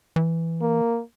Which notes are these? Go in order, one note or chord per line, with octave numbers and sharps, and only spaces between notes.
E3
A#3